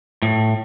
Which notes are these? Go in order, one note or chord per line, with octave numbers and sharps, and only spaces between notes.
A2